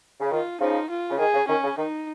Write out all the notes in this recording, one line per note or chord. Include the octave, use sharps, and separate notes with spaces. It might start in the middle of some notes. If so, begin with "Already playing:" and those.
C#3
D#3 F4
C#3 F3 D#4
F4
C#3
D#3 G#4
C#3
D#3 C#4
C#3
D#3 D#4